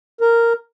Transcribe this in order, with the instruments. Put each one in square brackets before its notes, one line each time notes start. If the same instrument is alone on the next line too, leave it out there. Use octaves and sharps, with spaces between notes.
[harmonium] A#4